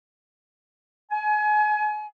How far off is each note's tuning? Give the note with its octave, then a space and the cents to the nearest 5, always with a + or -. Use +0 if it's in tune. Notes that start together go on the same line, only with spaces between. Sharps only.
G#5 +30